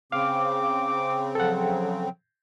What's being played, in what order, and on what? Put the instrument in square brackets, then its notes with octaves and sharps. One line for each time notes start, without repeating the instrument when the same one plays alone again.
[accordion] C#3 C4 [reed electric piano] F5 [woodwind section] D6
[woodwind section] F3 F#3 [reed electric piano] A4 F#5